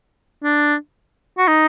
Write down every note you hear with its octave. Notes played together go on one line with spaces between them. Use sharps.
D4
F#4
D#4